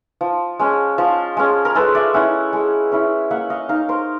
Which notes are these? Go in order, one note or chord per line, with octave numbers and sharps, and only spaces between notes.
F3
G#3 C#4
F3
G#3 C#4
A#4
G#3 A4 B4
D5 E5
C#4 E4 E5 F#5
G#3
C#4 E4
A#3 E5 F#5
D#5 F5
D#4 D#5 F5
A#4 C5